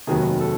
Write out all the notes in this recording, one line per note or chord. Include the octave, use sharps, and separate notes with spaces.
F1 D#2 D#3 F#3 B3 G#4 A#4
A4